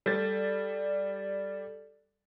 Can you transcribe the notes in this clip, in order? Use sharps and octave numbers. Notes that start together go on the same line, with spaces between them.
G3 A4 D5 A6